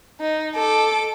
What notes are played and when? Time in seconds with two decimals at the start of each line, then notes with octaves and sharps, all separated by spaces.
0.20 D#4
0.55 A4 D6